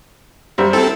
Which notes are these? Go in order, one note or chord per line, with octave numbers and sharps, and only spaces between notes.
F#2 G3 C5
C4 E4 A4